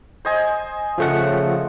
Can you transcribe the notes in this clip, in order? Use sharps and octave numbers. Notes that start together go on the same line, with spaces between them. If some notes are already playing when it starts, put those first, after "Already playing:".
C5 D#5 G#5
C#3 F3 A3 F#5